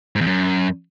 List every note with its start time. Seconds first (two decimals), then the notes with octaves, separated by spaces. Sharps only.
0.16 G#2
0.21 E2
0.27 F#2